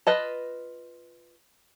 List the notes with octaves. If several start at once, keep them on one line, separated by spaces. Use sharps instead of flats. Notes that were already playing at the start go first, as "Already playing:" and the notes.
F4 B4 D#5 A5